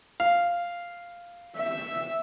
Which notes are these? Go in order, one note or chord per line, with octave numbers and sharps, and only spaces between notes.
F5
E5